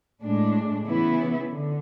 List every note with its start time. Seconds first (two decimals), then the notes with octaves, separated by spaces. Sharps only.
0.22 A2 G#3 D4
0.86 C#3 E3 B3 E4
1.51 D3